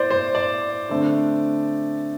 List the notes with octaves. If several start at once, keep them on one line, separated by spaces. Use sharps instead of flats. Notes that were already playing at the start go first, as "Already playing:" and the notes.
Already playing: A2 C5 D5
C5
D5
D3 A3 C4